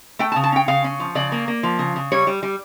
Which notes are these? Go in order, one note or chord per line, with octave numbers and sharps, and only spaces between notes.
A3 G5
A5
C#3
A5
C#4 G5
C#3 F5
C#4
F3
C#3 D5
A#3
A#3
F3
C#3
C#3
G3 C#5
G3
G3